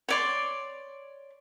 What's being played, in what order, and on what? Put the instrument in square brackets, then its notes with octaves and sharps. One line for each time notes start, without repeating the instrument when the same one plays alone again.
[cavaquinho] C#5 D5 C6